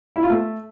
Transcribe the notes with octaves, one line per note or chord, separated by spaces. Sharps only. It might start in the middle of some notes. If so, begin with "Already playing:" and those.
E4
F4
A3